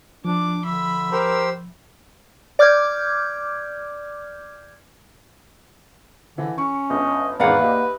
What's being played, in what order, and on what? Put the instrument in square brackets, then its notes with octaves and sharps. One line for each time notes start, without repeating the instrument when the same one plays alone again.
[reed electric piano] F3 [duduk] D4 [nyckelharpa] D6
[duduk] D3 [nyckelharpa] E5 B5
[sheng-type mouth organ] G4 C5 E6 [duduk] A#4
[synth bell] D5 D6 F6 G6 G#6
[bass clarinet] D3 [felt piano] E3
[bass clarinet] C#4 [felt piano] C#6
[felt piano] G1 [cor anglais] D#5
[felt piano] G#1 E2 [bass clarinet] A#4 [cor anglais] B4 [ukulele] D5 F5 F#5
[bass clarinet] A#3 [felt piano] G4 D#5 E5